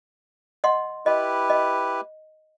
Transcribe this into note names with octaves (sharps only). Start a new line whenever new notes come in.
D#5 F#5 C6
E4 G4 B4 D#5
D#5